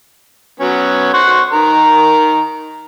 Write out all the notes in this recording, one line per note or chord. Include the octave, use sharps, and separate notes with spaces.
F#3 B3 C#4
C5 F#5 C#6
D#3 A#4